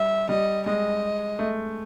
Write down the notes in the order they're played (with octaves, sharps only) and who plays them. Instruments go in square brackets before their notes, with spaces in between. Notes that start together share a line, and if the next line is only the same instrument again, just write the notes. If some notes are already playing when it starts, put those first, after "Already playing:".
Already playing: [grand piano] G3 [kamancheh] E5
[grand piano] G3 [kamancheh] D#5
[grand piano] G#3 [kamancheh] D#5
[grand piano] A3